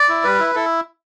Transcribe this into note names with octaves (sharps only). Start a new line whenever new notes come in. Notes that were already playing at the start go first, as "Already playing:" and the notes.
Already playing: D5
E4
G3 B4
E4
E4 A4